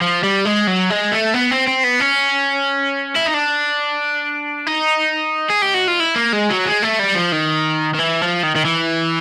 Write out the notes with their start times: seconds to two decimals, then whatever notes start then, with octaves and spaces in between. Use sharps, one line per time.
0.01 F3
0.23 G3
0.45 G#3
0.67 F#3
0.90 G#3
1.12 A3
1.34 B3
1.52 C4
1.68 C4
1.84 B3
2.01 C#4
3.16 E4
3.25 D#4
3.34 D4
4.67 D#4
5.50 G#4
5.62 G4
5.74 F#4
5.88 F4
6.00 E4
6.16 A#3
6.33 G#3
6.50 F#3
6.66 G#3
6.82 A3
6.99 G3
7.15 F3
7.32 D#3
7.95 D#3
7.99 E3
8.22 F3
8.43 D#3
8.56 D#3
8.65 E3